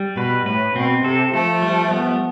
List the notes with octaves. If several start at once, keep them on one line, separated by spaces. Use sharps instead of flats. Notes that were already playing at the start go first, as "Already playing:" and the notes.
Already playing: G3
B2 B4
A2 B4
B2 C4
C3 A4
F3 A3 A4
G3
B3